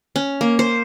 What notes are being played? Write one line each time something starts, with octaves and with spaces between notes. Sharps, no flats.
C#4
A#3
C5